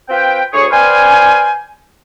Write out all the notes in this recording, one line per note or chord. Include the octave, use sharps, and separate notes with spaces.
C4 F4 B4 G5
D2 G#4 C#5
B4 C5 D5 F5 G5 G#5